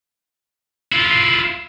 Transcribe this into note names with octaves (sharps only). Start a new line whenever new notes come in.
E4 F4